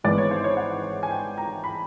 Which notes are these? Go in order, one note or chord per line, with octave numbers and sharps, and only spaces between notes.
G#1 G#2 E3 G#3 B3 D5
C#5
C5
C#5
F#5
G#5
G5
A#5
B5